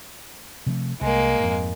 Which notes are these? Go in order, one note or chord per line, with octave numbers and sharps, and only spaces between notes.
C3 F3 A3
C2 G#3 A#3
F2 G#2